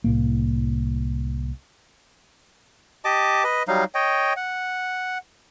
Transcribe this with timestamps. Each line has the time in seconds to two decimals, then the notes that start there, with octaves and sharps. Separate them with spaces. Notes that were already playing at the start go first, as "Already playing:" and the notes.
0.04 C2 A2 A#3
3.04 G4 D#5 A5 D6
3.44 B4 D#5
3.68 F#3 G3 D#4 F5
3.95 C#5 D#5 G5
4.37 F#5